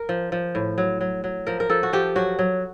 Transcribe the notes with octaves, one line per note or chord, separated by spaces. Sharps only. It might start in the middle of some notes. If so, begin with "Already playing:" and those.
Already playing: A#4
F3
F3
A2
F#3
F#3
F#3
F3 A#4
A#4
F3 A4
F#4
F3 G4
F#3 F#4
F#3